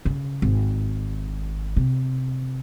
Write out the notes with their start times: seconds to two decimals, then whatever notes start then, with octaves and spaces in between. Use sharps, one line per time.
0.05 C#3
0.42 G#1
1.77 C3